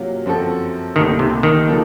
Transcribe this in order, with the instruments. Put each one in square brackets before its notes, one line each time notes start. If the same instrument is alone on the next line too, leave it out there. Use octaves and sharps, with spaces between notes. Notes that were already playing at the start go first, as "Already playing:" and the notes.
Already playing: [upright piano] C3 F#3 A#3 C#4 F4
F#2 F3 C4 F#4 A4
[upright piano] C2 A#2 A3 [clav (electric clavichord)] D#3
[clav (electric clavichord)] C3
D#3
[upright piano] C#3 F3 A#3 F4 A4